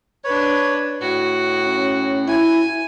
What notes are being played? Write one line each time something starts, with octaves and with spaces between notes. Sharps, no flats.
D4 B4 C#5
A2 F#4
C#4
E4 G#5